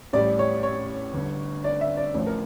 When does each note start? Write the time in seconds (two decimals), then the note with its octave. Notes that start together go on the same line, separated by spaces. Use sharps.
0.13 A1 A2 G3 D5
0.39 C#5
0.63 C#5
1.14 G1 G2 D3
1.64 D5
1.81 E5
1.97 D5
2.14 A1 A2 F3
2.26 A#4